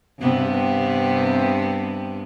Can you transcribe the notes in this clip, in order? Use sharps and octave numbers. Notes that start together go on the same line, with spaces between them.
G2 C3 B3